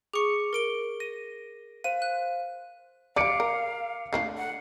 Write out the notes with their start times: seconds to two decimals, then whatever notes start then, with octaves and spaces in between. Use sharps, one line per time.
0.14 G#4 C#6 D6 C#7
0.53 A#4 D7 G7
1.00 A#6 D#7
1.84 C5 F5 D#7
2.02 F#6
3.16 G3 D5 F5 D6 C#7 D7
3.40 A#4
4.13 A3 D4 F4 C7
4.37 F#5